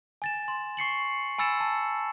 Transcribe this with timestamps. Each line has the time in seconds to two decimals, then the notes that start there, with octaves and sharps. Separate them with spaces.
0.22 G#5 A6 E7
0.48 C6
0.77 C#6 C7 C#7 F#7
1.38 G#5 B5 E6 A6 C#7 E7
1.60 A5